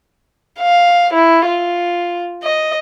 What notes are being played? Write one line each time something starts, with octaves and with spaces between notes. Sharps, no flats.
F5
E4
F4
D#5